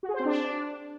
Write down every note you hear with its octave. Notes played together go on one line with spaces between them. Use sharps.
F#4
G#4
C5
C4
D4